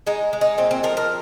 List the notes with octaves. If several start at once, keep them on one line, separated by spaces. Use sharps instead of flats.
G#3 D#4
G#3
D#4
A#2 C4
C4
F3 A#4
A#4